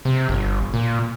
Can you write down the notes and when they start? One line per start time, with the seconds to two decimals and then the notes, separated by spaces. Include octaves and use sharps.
0.05 C3
0.29 G1
0.74 A#2